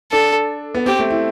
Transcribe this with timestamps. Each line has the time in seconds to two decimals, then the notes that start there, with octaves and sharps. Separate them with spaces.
0.12 D4 A4
0.75 B3
0.86 C4 G4
0.99 A3
1.11 E4